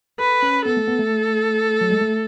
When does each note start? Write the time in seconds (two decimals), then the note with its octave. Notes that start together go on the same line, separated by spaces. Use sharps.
0.20 A4 B4
0.43 C#4
0.66 B3 A4
0.77 A3
0.88 B3
0.99 A3
1.81 F#3
1.91 G#3
2.01 A3